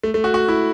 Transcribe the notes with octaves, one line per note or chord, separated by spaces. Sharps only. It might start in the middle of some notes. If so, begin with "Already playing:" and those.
A3
A3
F#4
F#4
E4